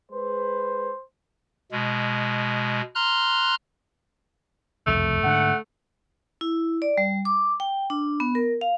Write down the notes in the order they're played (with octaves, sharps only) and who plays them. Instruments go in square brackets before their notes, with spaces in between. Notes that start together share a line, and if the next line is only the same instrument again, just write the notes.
[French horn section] G#3 B4 [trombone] C5
[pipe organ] B2 G#3
A#5 C6 F6 F#6
[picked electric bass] F#1 C2 F2 [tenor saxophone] A3
[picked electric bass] G#2 D3 [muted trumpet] F#5
[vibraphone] E4
D5
G3
D6
G5
D4
B3
A#4
F5